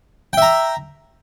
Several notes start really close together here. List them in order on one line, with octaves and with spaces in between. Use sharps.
G5 E5 A#5